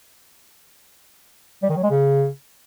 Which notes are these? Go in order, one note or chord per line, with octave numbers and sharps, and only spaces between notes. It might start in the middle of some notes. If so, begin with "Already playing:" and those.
G3
D#3
F#3
G#3
C#3